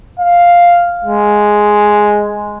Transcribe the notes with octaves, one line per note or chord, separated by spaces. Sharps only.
F5
G#3